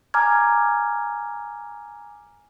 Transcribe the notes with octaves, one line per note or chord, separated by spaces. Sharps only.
G#5 A#5 D6 F6 G#6